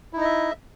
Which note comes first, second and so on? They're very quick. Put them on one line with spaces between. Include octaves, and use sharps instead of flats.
E4 D#4 D#5 E5